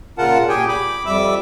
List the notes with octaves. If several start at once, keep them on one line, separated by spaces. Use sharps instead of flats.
A#2 C#3 F4 A#4 F#5 A5
A#2 G4 G#4 G5 G#5
B5 D6
F2 G3 E5 D6 E6